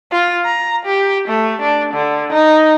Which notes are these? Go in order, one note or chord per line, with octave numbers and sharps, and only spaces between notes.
F4
A#5
G4
A3
D4
D3
D#4